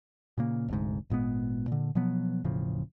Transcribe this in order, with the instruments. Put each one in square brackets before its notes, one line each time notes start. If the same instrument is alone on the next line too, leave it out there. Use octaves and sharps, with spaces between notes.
[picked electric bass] A#2 C#3 A#3
F1 D2 G#2
G#1 A#2 G#3 B3
A#2 D3
B2 F3 F#3 B3
E1 A2 C#3 F3